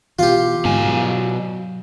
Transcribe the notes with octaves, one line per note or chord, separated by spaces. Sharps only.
B2 E3 F4 G4
G#2 B2 D3 G#3 G#5
F#3